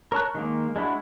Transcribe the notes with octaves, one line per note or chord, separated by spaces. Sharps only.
A#4 C#5 A5 F#6
D#3 G#3 A#3
G#3 D4 E4 F#4